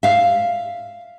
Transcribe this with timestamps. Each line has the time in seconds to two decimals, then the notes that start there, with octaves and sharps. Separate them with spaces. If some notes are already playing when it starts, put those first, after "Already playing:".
0.03 E5 F5